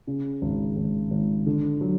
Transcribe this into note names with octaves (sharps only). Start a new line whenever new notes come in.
C#3
G#1
G#1
G#1
D3
F#3